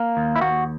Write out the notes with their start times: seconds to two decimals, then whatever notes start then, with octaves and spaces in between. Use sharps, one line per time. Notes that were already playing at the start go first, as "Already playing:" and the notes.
Already playing: A#3
0.17 D#2
0.36 E4
0.41 D#2 F#4